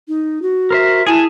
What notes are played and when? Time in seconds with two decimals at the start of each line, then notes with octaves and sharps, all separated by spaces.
0.08 D#4
0.42 F#4
0.71 A#4 C5 E5
1.07 E4 G#4 G#5 A5